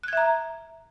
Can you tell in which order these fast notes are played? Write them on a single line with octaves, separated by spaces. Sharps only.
F#6 G#6 E5 A#5